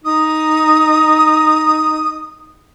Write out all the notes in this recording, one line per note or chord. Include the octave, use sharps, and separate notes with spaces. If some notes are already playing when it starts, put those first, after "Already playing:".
D#4 D#6